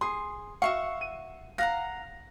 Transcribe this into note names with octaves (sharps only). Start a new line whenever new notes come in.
G#4 C6
F#4 E5 F5 C#6
D#7
F5 F#5 A#5 A#6